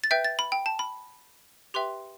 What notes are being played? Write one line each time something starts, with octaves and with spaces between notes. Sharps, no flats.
A6
B4 E5 G5 G6
A6
B5
G5
A5
B5
G4 B4 E5 G5 C6